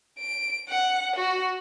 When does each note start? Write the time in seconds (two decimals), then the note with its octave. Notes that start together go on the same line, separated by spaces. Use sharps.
0.19 D7
0.69 F#5
1.16 F#4